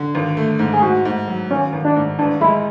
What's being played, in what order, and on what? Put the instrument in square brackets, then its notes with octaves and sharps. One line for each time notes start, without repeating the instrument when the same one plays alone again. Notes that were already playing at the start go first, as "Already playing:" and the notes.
Already playing: [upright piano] D3
G#1
A3
G#2
[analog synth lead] G#4
[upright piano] G#2 [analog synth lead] F#4
[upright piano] G#2
F#3
[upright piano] G#1 [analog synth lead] C#4
[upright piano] G#1
[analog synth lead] D4
[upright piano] G#2
[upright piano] A1 [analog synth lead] D4
[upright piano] G#3 [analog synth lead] E4